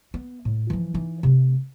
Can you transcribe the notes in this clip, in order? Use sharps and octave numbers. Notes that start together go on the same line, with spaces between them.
B3
A2
E3 F3
E3 D#4
C3 A3